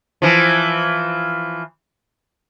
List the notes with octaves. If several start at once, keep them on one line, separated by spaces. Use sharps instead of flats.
E3 F3